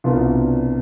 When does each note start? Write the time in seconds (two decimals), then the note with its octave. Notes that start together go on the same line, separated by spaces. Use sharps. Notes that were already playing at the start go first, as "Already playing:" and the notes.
0.04 C2 B2 B3 D4 F4